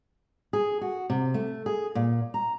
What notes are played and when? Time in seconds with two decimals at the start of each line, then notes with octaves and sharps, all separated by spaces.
0.53 G#4
0.81 F#4
1.10 C3
1.34 A3
1.66 G#4
1.95 A#2
2.34 A#5